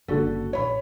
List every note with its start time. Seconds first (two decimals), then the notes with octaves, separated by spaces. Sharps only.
0.08 F#1 D3 G3 F#4 A4
0.53 A#1 C#5 B5